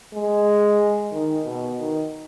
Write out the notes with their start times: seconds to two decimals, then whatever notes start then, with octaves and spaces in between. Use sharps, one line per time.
0.14 G#3
1.11 D#3
1.44 B2
1.77 D#3